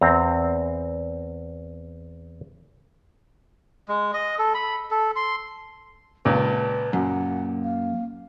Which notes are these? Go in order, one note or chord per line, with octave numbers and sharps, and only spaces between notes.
E2 C4 A#5
G#3
D#5
A4
B5
A4
C6
C#2 A#2 B4 A5
F#2 A#3 F#5
F5